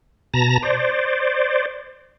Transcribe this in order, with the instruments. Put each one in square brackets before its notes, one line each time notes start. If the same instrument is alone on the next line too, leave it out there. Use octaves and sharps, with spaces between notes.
[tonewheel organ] B2 A5 A#5 A#6
C5 D5